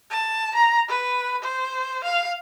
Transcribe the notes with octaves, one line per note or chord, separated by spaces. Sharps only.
A5
A#5
B4
C5
F5